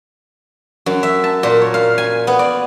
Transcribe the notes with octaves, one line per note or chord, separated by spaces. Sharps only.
F#2
E5
A5
A#2
C#5
F5
G#5
B3
D5